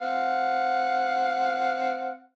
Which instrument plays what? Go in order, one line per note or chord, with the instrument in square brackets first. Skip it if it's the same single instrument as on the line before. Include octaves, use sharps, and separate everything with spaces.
[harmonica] C4 F5 F#5